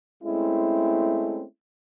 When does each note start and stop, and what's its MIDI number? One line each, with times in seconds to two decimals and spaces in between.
0.23 1.43 56
0.23 1.43 57
0.23 1.43 60
0.23 1.43 61
0.23 1.43 64